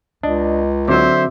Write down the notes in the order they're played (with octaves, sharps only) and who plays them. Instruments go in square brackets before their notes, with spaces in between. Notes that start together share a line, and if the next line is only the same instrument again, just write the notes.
[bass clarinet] C#2 [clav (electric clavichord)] D4 [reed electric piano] D#5
[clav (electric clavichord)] D3 F#3 [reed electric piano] C4 F#4 D6 [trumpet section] C5 E5